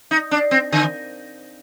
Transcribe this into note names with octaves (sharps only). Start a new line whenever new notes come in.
D#4
D4
C4
D3